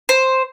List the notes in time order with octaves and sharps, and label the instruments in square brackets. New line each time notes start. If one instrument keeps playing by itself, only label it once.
[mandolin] C5